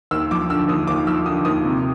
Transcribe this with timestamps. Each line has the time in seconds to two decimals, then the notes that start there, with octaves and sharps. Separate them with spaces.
0.11 D#2 E6
0.31 F3 D6
0.50 D3 E6
0.68 D#2 D#6
0.87 D#2 D6
1.07 F3 E6
1.26 D3 D#6
1.45 D#2 D#6
1.65 C3